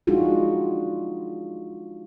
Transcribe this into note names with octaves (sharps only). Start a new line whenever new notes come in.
G#3 D4 D#4 F4 F#4 G#4